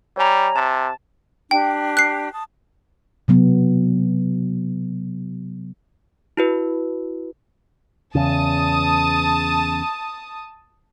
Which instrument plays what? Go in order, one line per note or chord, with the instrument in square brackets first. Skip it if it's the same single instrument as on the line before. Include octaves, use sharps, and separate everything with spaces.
[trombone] G3 [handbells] C#5 G#5 A#5
[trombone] C3 [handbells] A5 A6
[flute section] D4 G4 [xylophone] G5
[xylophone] F#6 C7
[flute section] A5 D#6
[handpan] C3 F#3 B3
[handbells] E4 F#4 B4
[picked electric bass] E2 C#3 [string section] A5 D#6